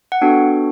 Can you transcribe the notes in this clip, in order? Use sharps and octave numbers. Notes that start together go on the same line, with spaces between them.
F#5
B3 D4 F#4 A4 G5